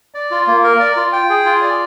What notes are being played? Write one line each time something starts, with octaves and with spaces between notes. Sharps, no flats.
D5
F4
A#3
A#4
D5
F4
G5
G#4
F4
D5